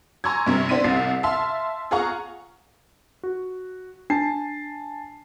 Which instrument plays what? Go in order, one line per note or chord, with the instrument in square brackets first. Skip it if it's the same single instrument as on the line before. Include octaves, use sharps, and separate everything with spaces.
[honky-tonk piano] G#5 A#5 C6 C#6 E6 G#6
G2 C3
B3 C4 D4 C6 B6 D#7
C2 C3 A6 C7
E5 F5 A5 C6
F4 G#4 F5 F#5 A#5 C#6
[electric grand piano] F#4
[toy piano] D4 [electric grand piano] G#5 A5 C7